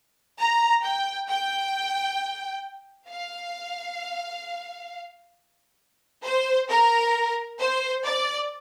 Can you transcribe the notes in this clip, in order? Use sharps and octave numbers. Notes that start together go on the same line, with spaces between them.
A#5
G5
G5
F5
C5
A#4
C5
D5